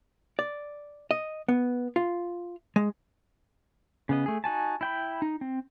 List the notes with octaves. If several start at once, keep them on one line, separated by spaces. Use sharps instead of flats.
D5
D#5
B3
F4
G#3
C#3 B3 D#5
A3 G#4
D#4 F#4 G#5 A5
E4 G5 B5
D#4
C4